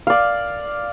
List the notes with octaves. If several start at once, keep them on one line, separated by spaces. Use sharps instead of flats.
D5 F5